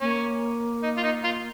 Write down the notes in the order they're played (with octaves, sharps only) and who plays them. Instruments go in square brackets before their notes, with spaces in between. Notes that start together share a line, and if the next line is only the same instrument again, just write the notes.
[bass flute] A#3 [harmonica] C#4
[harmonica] D#4
F4
D#4
F4